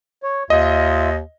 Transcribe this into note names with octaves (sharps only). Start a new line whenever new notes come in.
C#5
D#2 F4 D#5 E5